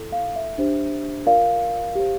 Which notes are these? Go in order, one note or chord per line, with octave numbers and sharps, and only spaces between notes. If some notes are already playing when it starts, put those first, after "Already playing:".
Already playing: E4 A4 D5
F5
E5
D4 G4 C5
F4 A#4 D5 F5
G4 C5